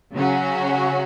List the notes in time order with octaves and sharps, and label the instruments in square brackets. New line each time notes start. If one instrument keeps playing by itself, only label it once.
[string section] C#3 F#3 C#4 F#4